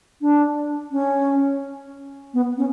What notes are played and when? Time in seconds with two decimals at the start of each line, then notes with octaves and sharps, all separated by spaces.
0.21 D4
0.92 C#4
2.34 B3
2.58 C#4